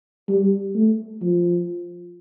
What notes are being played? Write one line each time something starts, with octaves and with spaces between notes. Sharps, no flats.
G3
A3
F3